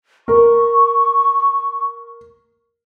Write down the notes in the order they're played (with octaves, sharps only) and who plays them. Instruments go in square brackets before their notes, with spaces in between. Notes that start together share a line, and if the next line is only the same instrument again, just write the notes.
[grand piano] A#4 [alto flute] C#6